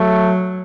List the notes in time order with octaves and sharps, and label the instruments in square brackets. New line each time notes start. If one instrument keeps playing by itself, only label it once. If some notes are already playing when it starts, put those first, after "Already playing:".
Already playing: [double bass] F#3 [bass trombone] A3